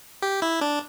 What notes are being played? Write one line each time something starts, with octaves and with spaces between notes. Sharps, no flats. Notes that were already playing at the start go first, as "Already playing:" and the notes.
G4
E4
D4